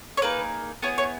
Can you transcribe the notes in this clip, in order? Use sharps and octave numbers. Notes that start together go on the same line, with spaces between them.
C#5
A#3 D#4 G#4 B4
B3 E4 G#4 C#5
C#5